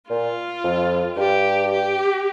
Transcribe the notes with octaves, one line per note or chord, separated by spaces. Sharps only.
A#2 F4
F2
G2 G4
G4